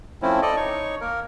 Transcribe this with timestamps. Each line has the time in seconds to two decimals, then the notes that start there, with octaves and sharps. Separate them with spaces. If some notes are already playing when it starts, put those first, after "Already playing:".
0.22 F3 A3 C4 C#4 E4
0.42 A4 D5 D#5
0.56 D#4 C#5 C#6
1.01 A#3 A#4